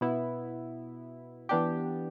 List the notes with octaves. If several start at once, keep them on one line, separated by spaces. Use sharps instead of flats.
B2 B3 E4
E3 B3 D4 G4